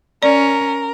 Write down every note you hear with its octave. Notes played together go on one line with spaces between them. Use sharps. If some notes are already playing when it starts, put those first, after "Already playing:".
C#4 A#4 D5